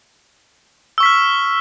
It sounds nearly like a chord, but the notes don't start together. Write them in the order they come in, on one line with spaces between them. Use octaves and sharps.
E6 C#6 B6 F6